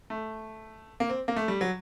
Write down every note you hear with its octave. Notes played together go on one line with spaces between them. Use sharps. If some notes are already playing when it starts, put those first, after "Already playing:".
A3
A#3
C4
A#3
A3
G3
F#3